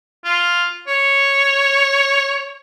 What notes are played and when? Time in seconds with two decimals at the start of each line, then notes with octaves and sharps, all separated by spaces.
0.25 F4
0.88 C#5